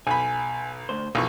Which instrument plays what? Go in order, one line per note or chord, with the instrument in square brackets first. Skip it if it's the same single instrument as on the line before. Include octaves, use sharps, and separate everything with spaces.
[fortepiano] B1 B5 [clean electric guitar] G#5
[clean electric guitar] D2 C5
[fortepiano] B1 C#6 [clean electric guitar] E3 F3 A#3